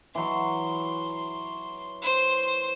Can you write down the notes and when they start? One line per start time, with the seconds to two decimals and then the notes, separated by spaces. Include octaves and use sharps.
0.15 E3 F#3 C6
2.02 C5 C6